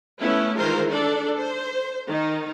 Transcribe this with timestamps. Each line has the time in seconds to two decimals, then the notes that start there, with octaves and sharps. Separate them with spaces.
0.21 A3 B3 C#4 E4
0.57 D#3 E3 G#3 F4 A#4 C5
0.90 D4 A4 D5
1.38 C5
2.07 D#3 D#4